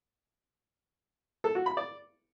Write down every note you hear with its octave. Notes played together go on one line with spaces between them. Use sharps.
A4
F#4
B5
D5